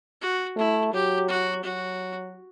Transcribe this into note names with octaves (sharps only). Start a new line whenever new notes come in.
F#4
A3 E4
F#3 G4
F#4
F#3 F#4